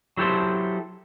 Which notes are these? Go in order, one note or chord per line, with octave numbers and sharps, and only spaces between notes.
F#3 E4 G4 A4 C5